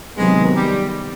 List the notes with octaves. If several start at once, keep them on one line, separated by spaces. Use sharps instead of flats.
C3 D#3 F#3 G#3 B3
G3